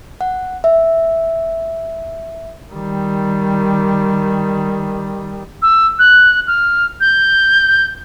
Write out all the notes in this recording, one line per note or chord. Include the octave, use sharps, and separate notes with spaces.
F#5
E5
D#3 G3
E6
F#6
F6
G6